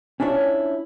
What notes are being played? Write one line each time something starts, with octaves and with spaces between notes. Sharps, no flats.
C#4 D4 E4 F4 C#5